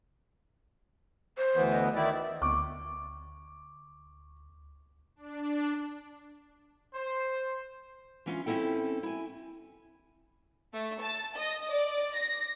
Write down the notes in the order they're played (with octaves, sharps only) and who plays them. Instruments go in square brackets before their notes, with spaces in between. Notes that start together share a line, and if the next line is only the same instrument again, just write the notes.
[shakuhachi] C5
[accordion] D2 E3 B3
[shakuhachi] D#5
[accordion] D#3 E4 D5 [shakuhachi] G5
[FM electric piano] D2 [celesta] C#6 [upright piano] D6
[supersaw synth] D4
[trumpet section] C5
[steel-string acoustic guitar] E3 C#4 F4
C4 C#4 E4 A4 G5
E4 G#5
[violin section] A3
A5
D#5
D5
A#6